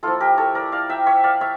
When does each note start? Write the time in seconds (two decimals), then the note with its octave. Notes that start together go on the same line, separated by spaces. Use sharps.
0.03 F3 A#3 E4 F4 A4
0.20 G4 A#4
0.38 A4 C#5
0.55 A#4 D5
0.72 D5 F5
0.90 E5 G5
1.06 C#5 E5
1.24 D5 F5
1.41 C#5 E5